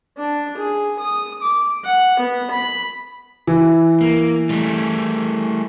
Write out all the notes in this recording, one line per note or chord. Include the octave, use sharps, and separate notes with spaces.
D4
G#4
D#6
D6
F#5
B3
B5
E3
A#3
G3 A3